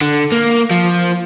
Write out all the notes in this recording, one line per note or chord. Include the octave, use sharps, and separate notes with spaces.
D3
A#3
F3